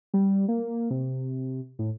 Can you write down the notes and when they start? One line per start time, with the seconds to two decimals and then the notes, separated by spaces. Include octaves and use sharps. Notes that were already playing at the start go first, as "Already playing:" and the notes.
0.14 G3
0.48 A#3
0.90 C3
1.79 A2